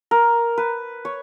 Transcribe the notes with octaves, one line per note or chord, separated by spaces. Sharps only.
A#4
B4
C#5